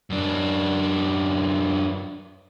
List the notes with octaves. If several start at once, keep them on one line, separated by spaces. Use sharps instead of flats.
F#2 D4